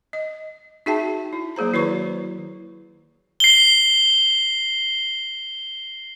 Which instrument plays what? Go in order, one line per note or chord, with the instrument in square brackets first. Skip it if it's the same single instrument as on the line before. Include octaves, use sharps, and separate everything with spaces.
[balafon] D#5
D#4 F#4 G#4 E5 G5 A5
E4
F#3 A#3 G#4 C5 A#5
D#3 E4 F#4 B4 C#5 C#6
[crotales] C7 G7